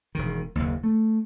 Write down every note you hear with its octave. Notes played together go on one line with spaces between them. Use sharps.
E1 D#3
F#1 D#2
A3